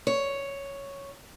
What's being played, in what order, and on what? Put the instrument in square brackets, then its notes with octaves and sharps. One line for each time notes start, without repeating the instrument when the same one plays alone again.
[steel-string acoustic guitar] C#5